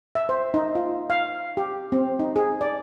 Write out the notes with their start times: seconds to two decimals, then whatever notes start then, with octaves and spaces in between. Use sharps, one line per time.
0.15 E5
0.29 C5
0.54 D#4
0.75 F4
1.10 F5
1.57 G4
1.92 C4
2.19 D#4
2.36 G#4
2.61 D5